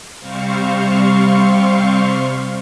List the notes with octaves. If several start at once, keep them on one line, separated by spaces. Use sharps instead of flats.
C3 G3 C4 C5 F5 C#6